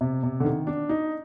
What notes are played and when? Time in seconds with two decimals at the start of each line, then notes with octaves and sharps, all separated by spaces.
0.01 C3
0.23 C3
0.40 D3
0.45 D#3
0.67 D4
0.89 D#4